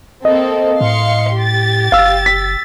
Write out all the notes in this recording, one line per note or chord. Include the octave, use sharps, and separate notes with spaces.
A#3 C4 A4 D#5
A2 F5 C6 C#7
G4 A6
F#1 F5 E6
B6